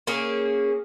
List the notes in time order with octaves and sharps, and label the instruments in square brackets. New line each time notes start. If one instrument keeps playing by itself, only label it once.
[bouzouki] A#3 C#4 G#4